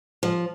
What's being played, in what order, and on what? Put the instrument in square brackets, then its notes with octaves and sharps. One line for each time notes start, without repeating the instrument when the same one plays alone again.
[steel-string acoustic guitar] F3